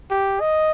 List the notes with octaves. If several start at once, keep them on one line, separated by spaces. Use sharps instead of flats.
G4
D#5